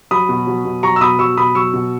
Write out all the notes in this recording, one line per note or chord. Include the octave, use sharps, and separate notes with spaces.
F#3 B5 D#6
B2
F#3
B2
F#3 A#5 C#6
E6
B2 B5 D#6
F#3 C#6 E6
B2 B5 D#6
F#3 C#6 E6
B2